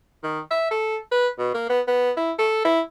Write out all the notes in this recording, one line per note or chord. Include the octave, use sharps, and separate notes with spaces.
D#3
E5
A4
B4
B2
A#3
B3
B3
E4
A4
E4